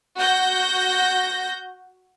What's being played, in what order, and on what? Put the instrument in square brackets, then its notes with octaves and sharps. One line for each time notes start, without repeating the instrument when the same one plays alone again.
[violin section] F#4 G6 A#6